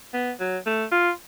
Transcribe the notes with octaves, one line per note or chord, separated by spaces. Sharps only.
B3
F#3
A3
F4